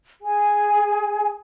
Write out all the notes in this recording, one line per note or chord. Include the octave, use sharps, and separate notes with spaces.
G#4 G#5